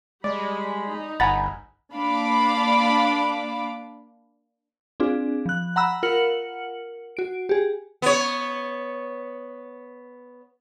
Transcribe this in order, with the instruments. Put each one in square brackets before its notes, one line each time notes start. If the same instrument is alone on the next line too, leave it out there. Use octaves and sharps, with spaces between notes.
[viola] G3 B5 [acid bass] G#3 [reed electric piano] D5
[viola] D#4
[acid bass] G1 [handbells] F#5 A6 [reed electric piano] G#5 A#5 B5
[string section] A#3 D4 F5 B5 D6
[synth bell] C4 D4 F4 G#4
F3 F#6
F#5 A#5 B5 E6 F#6
F4 A#4 F#5 F6 C#7 F#7
F#4 D7
G4 G#4
[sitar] B3 C#5